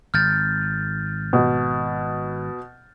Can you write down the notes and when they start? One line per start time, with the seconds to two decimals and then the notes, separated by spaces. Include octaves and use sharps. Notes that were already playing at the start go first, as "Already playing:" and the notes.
0.14 G#1 F6 G6 A6
1.33 B2